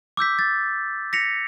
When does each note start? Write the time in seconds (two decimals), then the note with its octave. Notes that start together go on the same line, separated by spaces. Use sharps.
0.17 D6 E6 G6 B6
0.39 A6
1.13 A#6 B6 C#7 F7